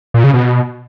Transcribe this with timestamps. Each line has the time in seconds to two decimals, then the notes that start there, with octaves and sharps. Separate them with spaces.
0.14 A#2
0.24 C#3
0.34 B2